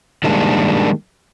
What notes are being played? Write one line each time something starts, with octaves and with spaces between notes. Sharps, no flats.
D#3 G3 G#3 A#3 D4